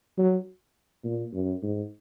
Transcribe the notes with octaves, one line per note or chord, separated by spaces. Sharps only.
F#3
A#2
F#2
G#2